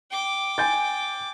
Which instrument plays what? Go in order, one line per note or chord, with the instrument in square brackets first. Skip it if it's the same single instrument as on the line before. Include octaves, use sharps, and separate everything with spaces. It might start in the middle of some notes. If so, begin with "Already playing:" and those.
[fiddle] G5 D6
[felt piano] G#5 G6 A6